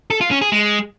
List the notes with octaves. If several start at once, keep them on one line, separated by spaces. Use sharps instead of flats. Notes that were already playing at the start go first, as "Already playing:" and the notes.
A4
F4
C#4
G#4
G#3